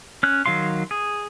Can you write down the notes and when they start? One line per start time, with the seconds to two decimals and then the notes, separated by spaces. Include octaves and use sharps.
0.23 C#4 F#6
0.46 D#3 F#3 F5 C6
0.91 G#4